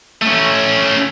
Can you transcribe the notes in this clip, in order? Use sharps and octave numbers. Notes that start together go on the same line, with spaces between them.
A3 C#4